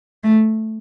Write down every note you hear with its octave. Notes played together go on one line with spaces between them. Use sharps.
A3